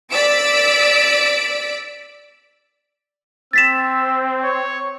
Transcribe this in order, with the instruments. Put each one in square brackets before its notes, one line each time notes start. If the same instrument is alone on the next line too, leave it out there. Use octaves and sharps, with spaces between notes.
[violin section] D5 E6 B6 D7
[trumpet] C4 [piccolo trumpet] E6 [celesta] A6 B6 E7
[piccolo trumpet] C#5